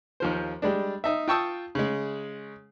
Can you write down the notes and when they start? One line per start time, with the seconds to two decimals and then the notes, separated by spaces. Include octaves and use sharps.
0.20 D#2 F3 C5
0.62 G3 G#3 D4
1.04 D#4 E5
1.28 F4 G5 A5 C#6 D#6 E6
1.75 C#3 G#3